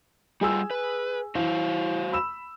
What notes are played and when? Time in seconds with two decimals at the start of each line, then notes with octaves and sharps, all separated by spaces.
0.41 G3 F4 G#4 G#5 E6
0.71 B4
1.35 E3 F#4 C5 F5
2.13 B5 E6 E7